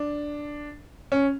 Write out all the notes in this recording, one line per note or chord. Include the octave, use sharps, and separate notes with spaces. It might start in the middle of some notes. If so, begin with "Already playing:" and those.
Already playing: D4
C#4